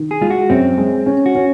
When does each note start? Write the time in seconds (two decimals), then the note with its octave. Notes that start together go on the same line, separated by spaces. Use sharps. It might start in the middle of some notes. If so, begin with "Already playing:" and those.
Already playing: D#3
0.11 G#4
0.21 G#3 F4
0.30 F#4
0.49 F#2 C4
0.78 G#3
1.06 C#4
1.26 F#4
1.35 C#4